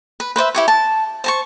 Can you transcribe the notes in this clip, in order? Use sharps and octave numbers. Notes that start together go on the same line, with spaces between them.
B4
B4 C5 D5 E5
E4 G4 C#5
A5
C5 A5 C#6